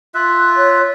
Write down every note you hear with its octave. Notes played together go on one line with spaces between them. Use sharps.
F4 E5 F#6
C#5